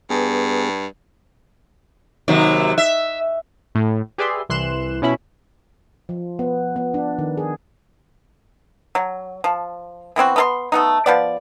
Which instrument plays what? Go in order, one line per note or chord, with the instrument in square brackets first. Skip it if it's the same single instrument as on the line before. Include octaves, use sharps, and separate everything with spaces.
[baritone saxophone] G2 [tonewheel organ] B3 G#4
[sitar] D#2 C3 F#3
E5
[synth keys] A2
G4 G#4 B4 D5 E5 C6
C2 E3 C6 F#6 E7
B2 C#4 E4 B5
[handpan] F3
B3
B3
D4
D#3
G#4
[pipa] F#3
F3
E3 B3 C4 F#4
B3 A4 C6
A3 B3 D#4
F3 B3 D5